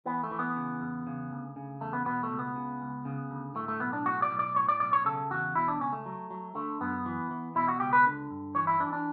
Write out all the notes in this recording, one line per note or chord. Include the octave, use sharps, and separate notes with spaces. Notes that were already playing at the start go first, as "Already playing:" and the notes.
E3 B3
A3
E3
B3
C#3
E2
C#3
D2
C#3
E2 A3
B3
B2 B3
A3
C#2
B3
C#3
C#2
C#3
D2
A2 A3
A3
B1 B3
D4
A2 F#4
D5
B1
D5
A2 C#5
D5
B1 D5
C#5
C#3 A4
E2 F#4
B2 E4
D4
C#2 C#4
A3
F#3
F#3
D3 A3
F#2 B3
E3
E3
B2 E4
F#4
C#2 G4
B4
D3
G2
E3 C#5
E4
E3 D4
D4